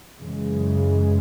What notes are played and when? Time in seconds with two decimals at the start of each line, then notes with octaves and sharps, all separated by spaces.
0.17 F#2 C#3 E3 G#3